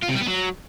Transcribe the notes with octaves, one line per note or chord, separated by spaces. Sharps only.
F4
C3
G3
B3
F#3